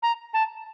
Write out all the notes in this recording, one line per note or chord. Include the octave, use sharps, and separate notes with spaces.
A#5
A5